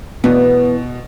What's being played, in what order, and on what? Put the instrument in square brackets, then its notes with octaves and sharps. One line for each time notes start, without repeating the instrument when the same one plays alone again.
[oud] E2 B3 [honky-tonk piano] B2